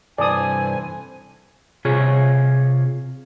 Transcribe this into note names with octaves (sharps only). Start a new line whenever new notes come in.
G2 C3 E3 A4 C5 D5 G#5 D#6
C3 F4 G#4 C#5